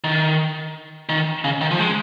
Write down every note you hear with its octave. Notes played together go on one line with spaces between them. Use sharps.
D#3
D#3
C#3
D#3
F3
G#3